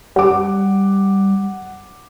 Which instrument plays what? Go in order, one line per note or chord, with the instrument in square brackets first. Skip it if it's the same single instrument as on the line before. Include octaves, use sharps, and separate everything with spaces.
[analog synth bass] G3 [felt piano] F#5 D6